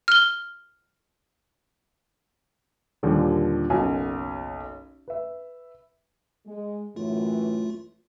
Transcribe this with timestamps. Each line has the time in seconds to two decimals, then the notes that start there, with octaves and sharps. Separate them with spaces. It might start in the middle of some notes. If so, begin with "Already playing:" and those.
0.08 F6 G7
3.03 D#2 A#2 D3 F3 G3
3.70 F#1 B1 F#4 G#5
5.08 B4 E5
6.46 G#3
6.96 F#2 A2 E3 A3 F4